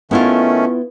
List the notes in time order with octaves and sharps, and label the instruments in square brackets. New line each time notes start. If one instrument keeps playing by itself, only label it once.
[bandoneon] D#3 A3 C#4 [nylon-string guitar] B3 E4 F4